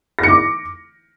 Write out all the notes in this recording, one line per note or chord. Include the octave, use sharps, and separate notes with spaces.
D6 A#6 C#7